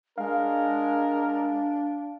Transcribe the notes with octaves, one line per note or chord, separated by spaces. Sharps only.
G#3 D4 A#4 F5